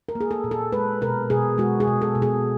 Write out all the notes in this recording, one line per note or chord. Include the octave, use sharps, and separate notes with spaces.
A#4
A#3
G#4
A4
A#2
A4
G#3 B4
B2 A#4
B2 G#4
G#3 F#4
G#4
B2
A4
B2
G#4